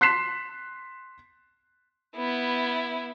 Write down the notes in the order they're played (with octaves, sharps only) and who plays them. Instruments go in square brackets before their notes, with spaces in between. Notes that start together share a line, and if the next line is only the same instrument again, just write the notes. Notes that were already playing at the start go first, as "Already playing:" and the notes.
[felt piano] C6 F#6 B6 C7 E7
[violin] B3 E4